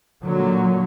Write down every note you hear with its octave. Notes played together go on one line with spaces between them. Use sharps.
A#2 D3 F#3